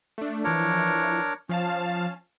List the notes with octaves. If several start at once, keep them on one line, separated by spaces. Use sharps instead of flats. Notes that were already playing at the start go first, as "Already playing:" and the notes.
A3 D4
E3 F3 D4 A#4 C#5
F3 C#4 F5 A5